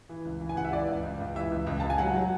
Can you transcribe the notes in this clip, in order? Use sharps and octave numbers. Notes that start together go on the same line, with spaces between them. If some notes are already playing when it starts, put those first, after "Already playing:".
E3
C#2
E3
G#5
C#2 F#5
E5
E3 D5
C#2
C#2
C#2
E3 E5
C#2
C#2
C#2 A5
G#5
F#3 F#5
F#3